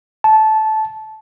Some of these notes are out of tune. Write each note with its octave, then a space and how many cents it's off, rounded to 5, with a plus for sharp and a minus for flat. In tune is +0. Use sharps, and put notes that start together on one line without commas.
A5 -15